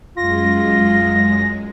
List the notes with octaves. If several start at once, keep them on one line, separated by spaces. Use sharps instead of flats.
F#2 G#3 F4 A#6